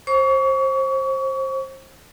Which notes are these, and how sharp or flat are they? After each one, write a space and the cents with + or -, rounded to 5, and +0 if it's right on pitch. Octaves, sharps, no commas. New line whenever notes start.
C5 +25 C#6 +35